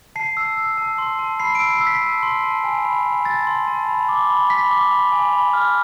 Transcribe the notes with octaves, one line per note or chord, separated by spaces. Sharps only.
A5 C7
E6
E6
A5
C6
A5
B5 C7
D7
E6
C7
E6
B6
A5
C6
A5
G#5
B5
G#5
A5 A6
C6
A5
B5
D6
B5
B5 B6
D6
B5
G#5
B5
F6